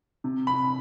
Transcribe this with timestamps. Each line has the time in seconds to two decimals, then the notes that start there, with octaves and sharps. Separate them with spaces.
0.24 C3
0.47 B5